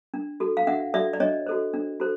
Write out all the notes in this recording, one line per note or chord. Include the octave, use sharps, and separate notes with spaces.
D4
F#4 A4
F5
D4 E5 F#5
F#4 A4 D5 E5
D5
D4 C#5 D#5
F#4 A4 C5
D4
F#4 A4 C5